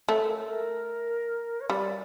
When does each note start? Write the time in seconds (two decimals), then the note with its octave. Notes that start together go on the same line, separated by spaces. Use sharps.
0.09 A3 C#5
0.22 A#4
0.36 A4
0.50 A#4
1.61 C#5
1.69 G3 D5